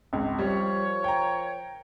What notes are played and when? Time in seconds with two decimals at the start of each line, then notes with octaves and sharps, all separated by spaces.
0.13 G#1 C#2
0.39 F3 G3 A#4 C#5
1.04 G5 A#5